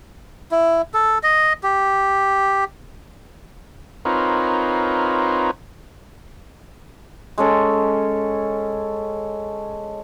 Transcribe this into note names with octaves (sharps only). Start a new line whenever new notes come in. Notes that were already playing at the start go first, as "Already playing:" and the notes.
E4
A4
D#5
G4
C4 D#4 F4 A#4 B4 C#5
G#3 C#4 A4